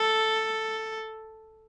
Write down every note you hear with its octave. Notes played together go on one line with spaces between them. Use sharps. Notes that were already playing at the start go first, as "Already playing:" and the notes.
Already playing: A4